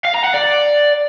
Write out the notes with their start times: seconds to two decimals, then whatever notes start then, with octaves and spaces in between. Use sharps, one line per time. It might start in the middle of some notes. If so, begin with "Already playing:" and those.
0.05 F5
0.15 A#5
0.24 F#5
0.34 D5